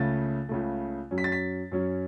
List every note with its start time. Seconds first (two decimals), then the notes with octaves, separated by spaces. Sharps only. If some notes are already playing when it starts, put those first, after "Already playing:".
Already playing: C#2 C#3 A3 A6
0.49 C#2 C#3 A3
1.11 F#2 F#3 C#4
1.18 B6
1.24 A6
1.32 B6
1.72 F#2 F#3 C#4